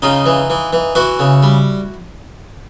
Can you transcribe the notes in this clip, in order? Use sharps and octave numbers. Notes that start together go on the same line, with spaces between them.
C#3 D#4 F4
E3
E3
E3
E3 E4 F#4
C#3
G3